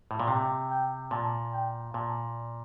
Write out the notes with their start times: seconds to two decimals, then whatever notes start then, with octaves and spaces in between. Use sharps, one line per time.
0.11 A2
0.20 A#2
0.28 C3 G5
0.70 G5
1.11 A#2 A5
1.53 G5
1.94 A#2 A5